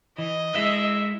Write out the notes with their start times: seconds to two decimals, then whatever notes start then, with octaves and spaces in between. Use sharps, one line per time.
0.18 E3 D#5
0.55 G#3 E4 E5